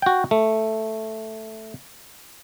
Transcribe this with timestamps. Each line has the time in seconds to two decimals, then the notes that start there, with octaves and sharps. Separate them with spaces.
0.02 F#4 G5
0.31 A3